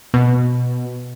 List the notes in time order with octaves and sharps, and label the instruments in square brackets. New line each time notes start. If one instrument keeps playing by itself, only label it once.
[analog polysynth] B2